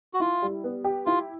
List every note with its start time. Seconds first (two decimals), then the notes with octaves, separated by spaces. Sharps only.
0.14 F#4
0.20 E4 F4
0.42 G3
0.64 B3
0.84 G4
1.06 E4 F4